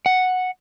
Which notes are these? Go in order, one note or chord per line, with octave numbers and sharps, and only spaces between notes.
F#5